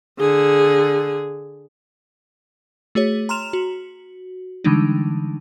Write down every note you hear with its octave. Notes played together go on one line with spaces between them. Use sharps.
D3 G#4
A3 F#4 G#4 C#5
A#5 C6 F6 E7 F7
F#4
D3 E3 G3 G#3 D4 D#4